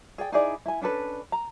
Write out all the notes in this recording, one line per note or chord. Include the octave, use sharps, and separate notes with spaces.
G#4 D5 G5
D#4 E4 G#4 D5
E4 G#5
C#4 D4 A4 B4
A#5